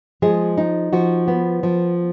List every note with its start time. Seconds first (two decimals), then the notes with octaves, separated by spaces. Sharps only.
0.22 F3 G#3 G#4
0.58 D#4
0.93 F3 F#4
1.28 B3
1.63 F3